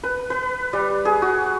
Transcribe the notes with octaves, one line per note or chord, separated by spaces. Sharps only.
B4
B4
G3
G#4
F#4